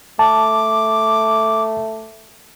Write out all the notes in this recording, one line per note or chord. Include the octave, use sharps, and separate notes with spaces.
A3 A5 D6